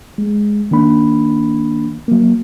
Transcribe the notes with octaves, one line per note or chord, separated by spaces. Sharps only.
G#3
D#3 A#3 D4 B5
F#3 A#3